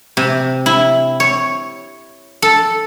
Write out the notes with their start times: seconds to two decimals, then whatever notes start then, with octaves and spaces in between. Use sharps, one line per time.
0.17 C3
0.66 E4
1.20 C#5
2.42 A4